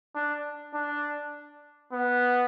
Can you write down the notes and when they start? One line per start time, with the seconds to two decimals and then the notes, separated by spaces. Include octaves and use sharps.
0.15 D4
0.74 D4
1.93 B3